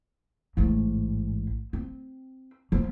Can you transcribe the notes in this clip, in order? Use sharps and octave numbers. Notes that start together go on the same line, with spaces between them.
A1 G#2
C4
F3 B3